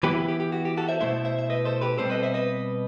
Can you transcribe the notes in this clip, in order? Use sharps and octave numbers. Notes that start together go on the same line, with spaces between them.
E3 B3 E4 G4 B4
G4
G4
F#4
G4
F#4 A4
C5 E5
B2 A3 E4 C5 E5
C5 E5
E5
B4 D#5
A4 C5
G4 B4
B2 G3 C4 A4 C5
B4 D#5
C5 E5
B4 D#5